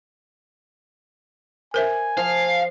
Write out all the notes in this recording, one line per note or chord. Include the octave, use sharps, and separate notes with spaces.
A#4 C5 E5 G#5
F3 F5